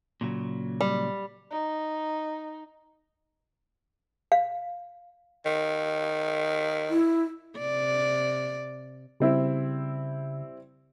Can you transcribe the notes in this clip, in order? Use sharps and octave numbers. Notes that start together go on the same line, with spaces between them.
A#2 C#3 F#3
G3
D#4
F5
D#3
E4
C3 D5
C#3 G3 C4 E4